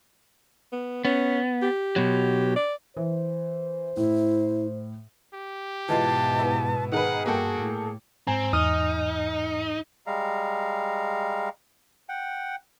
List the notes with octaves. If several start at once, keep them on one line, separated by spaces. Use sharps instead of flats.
B3
B3 C#4
G4
B2 F#3
D5
E3 C5
A2 E4
G4
G#2 B2 E3 G#3 F4 A5
B3 E4
D#3 G#4 A#4 B4 F#5
G2 A#3 F#4 A4 G5
A2
G#2 C4 G#5 A#5
E2 D#4 D#6 F6
G3 G#3 F5 A#5
F#5 G5